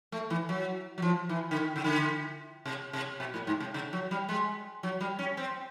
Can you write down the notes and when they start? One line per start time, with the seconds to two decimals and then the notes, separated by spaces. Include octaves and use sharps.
0.12 A3
0.30 E3
0.49 F#3
0.98 F#3
1.02 F3
1.29 E3
1.51 D3
1.57 D#3
1.76 C#3
1.84 D3
2.66 C3
2.93 C3
3.20 B2
3.34 A2
3.47 G#2
3.60 C3
3.74 C#3
3.93 F#3
4.11 G3
4.29 G#3
4.83 F#3
5.01 G3
5.19 C#4
5.37 C4